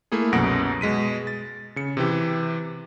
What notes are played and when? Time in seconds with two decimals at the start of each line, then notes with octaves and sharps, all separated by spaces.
0.12 A3 A#3 E4 G#4
0.33 C2 F#2 B2 F#5 A#6 D7
0.81 B2 G#3 B6 D#7
1.27 A6
1.76 C#3 C#7
1.97 C3 E3 G4